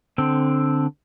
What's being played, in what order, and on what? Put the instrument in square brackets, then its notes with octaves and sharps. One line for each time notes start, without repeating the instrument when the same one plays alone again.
[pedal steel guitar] D3 C4